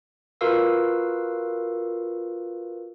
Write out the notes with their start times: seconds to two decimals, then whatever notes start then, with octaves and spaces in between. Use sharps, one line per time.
0.41 F4 F#4 A#4 B4 F5 E6